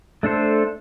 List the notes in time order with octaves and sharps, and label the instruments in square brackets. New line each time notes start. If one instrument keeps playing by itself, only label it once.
[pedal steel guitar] A3 D4 A4 C5